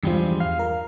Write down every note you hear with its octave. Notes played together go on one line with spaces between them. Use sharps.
E2 G2 F3 G3 G#3
F5
A#4